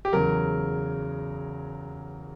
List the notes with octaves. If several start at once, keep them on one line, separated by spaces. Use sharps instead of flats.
G4
E2 C#3 F#3 A#4